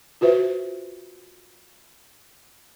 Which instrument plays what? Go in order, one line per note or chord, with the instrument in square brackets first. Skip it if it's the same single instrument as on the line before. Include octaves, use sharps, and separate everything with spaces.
[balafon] F4 F#4 B4 C5 E5